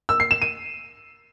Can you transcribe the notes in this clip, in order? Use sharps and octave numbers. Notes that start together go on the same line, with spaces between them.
E6
C7
E7
D#7